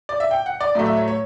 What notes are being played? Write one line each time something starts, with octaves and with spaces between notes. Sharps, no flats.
D5
E5
G5
F#5
D5
A2 F#3 A3 D5
E5
C#5
C#5